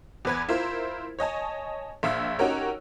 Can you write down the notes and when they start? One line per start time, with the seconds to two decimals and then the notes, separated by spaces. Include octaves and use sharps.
0.25 E2 B4 G#6
0.49 E4 F4 A#4 C5
1.19 C#5 D#5 G#5 A5
2.03 A#1 E5 F5 E6
2.39 C#4 D#4 F#4 G4 A#4 C#5